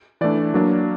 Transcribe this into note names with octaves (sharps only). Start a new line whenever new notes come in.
E3 A3 D4 D5
F#3 A#3 D4